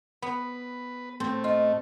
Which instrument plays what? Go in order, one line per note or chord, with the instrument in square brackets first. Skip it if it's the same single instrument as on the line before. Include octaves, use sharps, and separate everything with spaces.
[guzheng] B3 [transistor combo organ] B4
[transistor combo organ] A2 A3 [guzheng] C4
[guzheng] F4 [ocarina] D#5